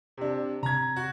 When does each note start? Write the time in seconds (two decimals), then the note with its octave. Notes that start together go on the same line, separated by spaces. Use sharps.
0.17 C3 D4
0.63 C3 A#5 G#6
0.96 F#4